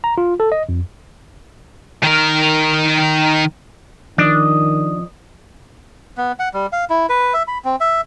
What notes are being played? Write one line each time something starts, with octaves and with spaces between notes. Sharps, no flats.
A#5
F4
A4
D#5
F2
D#3 A#4
D#3 F3 D4 D5 D#5
B3
F#5
G3
F5
E4
B4
E5
B5
C4
E5